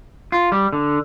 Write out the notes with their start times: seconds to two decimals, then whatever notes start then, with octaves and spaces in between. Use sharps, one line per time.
0.32 F4
0.52 G3
0.73 D3